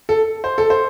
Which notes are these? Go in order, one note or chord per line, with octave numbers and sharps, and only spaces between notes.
A4
C5
A4
C5